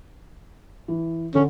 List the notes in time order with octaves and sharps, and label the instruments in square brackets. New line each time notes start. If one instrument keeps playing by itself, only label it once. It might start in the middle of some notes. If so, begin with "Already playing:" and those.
[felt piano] E3
[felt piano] D3 [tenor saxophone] C#4